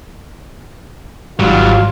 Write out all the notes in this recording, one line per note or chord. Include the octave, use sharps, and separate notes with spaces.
G#1 G#2 F#3 G3 F4